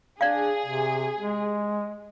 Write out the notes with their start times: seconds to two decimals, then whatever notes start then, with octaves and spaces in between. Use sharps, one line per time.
0.21 D4 G#4 D5 F5
0.66 C3
1.20 G#3